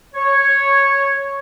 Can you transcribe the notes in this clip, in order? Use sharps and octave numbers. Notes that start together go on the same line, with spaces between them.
C#5